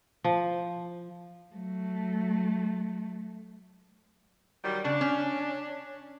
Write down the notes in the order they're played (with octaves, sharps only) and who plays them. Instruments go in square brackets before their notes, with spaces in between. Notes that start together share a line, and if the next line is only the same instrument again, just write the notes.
[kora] F3
[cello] F#3 A3
[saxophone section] D#3 F#3 G3
[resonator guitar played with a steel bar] C#3 [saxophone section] D4
[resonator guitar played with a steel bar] C#4